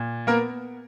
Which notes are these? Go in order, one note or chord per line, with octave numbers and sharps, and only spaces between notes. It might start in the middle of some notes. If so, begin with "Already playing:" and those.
Already playing: A#2
A#3 B3 A#4